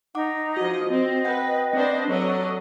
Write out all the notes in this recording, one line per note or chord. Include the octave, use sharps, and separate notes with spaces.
D#4 F#5 D6
F3 F#4 D#5
C4 D#5
B4 F#5 G5 G6
C4 D4 B4 C5
F#3 A4 D5 D#5